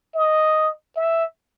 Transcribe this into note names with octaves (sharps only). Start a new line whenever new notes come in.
D#5
E5